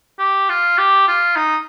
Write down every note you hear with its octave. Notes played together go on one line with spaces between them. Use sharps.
G4
F4
G4
F4
D#4